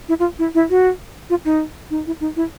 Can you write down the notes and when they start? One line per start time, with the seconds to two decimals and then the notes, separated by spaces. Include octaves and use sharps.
0.09 E4
0.19 F4
0.39 E4
0.55 E4
0.70 F#4
1.30 F4
1.45 D#4
1.90 D#4
2.07 E4
2.21 D#4
2.36 E4